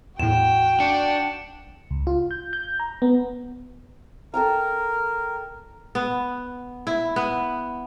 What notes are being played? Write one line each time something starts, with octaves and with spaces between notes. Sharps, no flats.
E2 A2 F#4 G5 E7
D4 C#7
C#2
F4
G6
G6
A#5
B3
A4 A#4 G5 A#5
B3
E4
B3